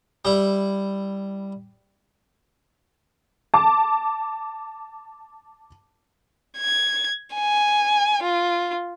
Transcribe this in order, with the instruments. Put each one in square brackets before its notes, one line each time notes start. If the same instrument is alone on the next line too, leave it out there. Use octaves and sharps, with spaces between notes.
[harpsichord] G3 E4
[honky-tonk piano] A5 D6
[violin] G#6
G#5
F4